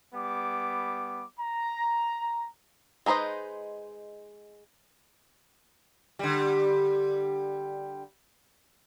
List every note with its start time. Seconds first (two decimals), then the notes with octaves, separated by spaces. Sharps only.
0.13 G3 B3 D6
1.39 A#5
3.06 G#3 D#4 B4 C5 D#5
6.19 D3 G3